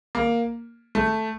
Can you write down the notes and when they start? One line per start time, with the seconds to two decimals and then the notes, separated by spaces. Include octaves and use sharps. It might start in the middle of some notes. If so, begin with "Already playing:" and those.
0.15 A#3
0.95 A3